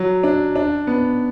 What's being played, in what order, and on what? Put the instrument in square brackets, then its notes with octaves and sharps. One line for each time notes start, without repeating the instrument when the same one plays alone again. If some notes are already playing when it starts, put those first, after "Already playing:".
Already playing: [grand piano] F#3
D4
D4
B3